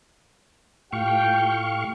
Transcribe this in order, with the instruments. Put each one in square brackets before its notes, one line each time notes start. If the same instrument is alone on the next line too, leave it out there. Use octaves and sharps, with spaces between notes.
[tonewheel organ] A2 F5 C#6 [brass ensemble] F4 G4 G5